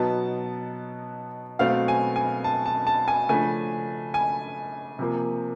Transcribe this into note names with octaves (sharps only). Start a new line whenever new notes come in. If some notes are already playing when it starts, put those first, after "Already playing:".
Already playing: B2 F#3 B3 D#4 A5
B2 F#3 A3 C4 F5
G#5
G#5
A5
A5
A5
G#5
C#3 F3 A3 D4 G#5
G#5
C3 F3 A#3